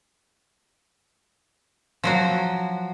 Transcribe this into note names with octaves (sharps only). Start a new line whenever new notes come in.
F3 F#3 F#4